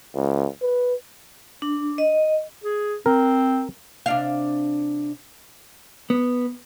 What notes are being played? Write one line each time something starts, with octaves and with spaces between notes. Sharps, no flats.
C#2
B4
D4
D#5
G#4
C4 A#4
C3 D4 F5
B3